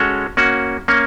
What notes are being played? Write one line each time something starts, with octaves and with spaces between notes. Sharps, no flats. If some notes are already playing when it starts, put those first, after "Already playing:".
Already playing: G#3 C#4 F#4 A4 C#5
A#3 C#4 F#4
A#3 C#4